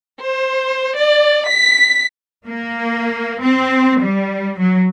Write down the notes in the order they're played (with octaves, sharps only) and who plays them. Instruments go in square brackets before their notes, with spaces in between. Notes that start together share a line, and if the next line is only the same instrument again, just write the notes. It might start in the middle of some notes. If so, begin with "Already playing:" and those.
[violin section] C5
D5
B6
[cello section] A#3
C4
G3
F#3